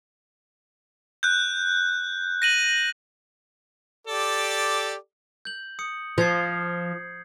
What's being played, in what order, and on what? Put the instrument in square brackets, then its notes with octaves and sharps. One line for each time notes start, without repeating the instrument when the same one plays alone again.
[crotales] F#6 G6
A#6 D#7 F#7
[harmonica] G4 A4 D5
[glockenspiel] G6 F#7
D#6 C#7
[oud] F3 [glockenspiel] G6 G#6 C7